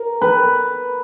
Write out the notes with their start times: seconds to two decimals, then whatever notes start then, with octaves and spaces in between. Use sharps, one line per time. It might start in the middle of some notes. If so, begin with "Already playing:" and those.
Already playing: A#4
0.22 B4